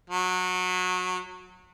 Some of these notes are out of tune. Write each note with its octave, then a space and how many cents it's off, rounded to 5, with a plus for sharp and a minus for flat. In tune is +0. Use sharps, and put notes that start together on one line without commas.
F#3 -20